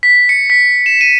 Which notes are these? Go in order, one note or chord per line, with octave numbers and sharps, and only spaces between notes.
B6
C#7
B6
E7
D#7